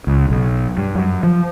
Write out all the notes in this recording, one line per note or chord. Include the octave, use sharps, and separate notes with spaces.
C#2
B1
G2
F#2
F3